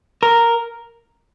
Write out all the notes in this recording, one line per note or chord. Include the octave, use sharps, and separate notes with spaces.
A#4